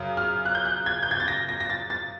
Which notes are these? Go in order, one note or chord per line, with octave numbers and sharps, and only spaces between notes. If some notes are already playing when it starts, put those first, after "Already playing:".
Already playing: F#2 C#3
F6
F#6
G6
F#6
G#6
G6
G#6
A6
A#6
A#6
A#6
A6
A6